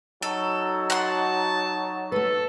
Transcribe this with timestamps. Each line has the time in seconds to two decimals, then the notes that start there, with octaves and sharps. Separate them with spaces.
0.23 F#3 D#4 F#4 A4
0.90 F#5 A5 C6
2.12 A3 A4 B4